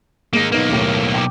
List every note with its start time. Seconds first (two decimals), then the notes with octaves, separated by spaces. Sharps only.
0.33 G#2 G#3 A#3 D#4
0.52 B1 A#3 B3 D#4
0.69 D#2 A2
1.14 G5 D6